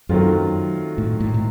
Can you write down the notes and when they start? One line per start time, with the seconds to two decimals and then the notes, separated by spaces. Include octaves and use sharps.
0.09 F#2 D#3 F#3 A3 C4 F4
0.98 A2
1.20 A2
1.34 A2